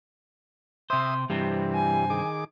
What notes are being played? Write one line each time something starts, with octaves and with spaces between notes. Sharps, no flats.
C3 C5 E5 C6 D#6
G2 C3 E3 G3 C4
G#5
D#3 G#4 D6